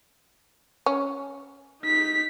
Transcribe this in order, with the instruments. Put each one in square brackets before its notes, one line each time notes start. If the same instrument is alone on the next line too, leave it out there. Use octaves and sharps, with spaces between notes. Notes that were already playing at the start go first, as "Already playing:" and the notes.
[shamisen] C#4
[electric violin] D#4 B6